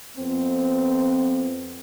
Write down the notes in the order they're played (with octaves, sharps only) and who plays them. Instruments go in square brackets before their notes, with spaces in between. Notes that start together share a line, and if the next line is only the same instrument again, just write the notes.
[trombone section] F2 B3 C4